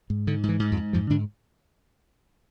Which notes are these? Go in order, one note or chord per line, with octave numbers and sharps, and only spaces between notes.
G#2
G#2 D3
G#2
E3
G#2
F2 F3
G#2
F2 G#2 F3
G#2 D3 D4